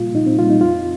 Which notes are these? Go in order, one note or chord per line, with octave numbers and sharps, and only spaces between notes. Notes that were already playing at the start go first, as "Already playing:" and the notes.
Already playing: A#2 G3 A#3 F4
A#2 D#4
C4
G3 A#3 F4
D#4
F2 F4